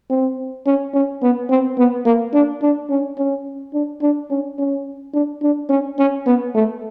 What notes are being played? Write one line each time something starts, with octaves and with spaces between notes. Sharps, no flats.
C4
C#4
C#4
B3
C4
B3
A#3
D4
D4
C#4
C#4
D4
D4
C#4
C#4
D4
D4
C#4
C#4
B3
A3